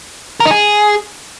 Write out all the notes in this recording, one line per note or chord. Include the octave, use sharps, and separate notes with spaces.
A#4
D#4
G#4